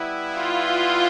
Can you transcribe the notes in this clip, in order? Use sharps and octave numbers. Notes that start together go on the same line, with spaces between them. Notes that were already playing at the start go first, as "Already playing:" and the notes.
Already playing: G3 B3 E4 B4
F4